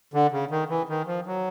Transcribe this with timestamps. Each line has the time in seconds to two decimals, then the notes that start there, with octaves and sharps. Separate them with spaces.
0.14 D3
0.32 C#3
0.51 D#3
0.69 E3
0.89 D#3
1.07 F3
1.26 F#3